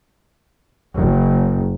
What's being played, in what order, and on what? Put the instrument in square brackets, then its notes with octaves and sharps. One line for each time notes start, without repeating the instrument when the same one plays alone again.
[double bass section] F#1